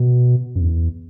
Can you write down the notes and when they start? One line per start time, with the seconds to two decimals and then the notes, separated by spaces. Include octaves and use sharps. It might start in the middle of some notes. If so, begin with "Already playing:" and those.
Already playing: B2
0.56 F#2
0.60 E2